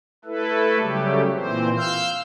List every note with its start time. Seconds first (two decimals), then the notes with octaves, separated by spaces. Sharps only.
0.25 A3 E4 A4 B4
0.79 C#3 F#3 G3 A3 G4
1.32 A#2 E3 C4 C5
1.77 F5 E6 F6 G6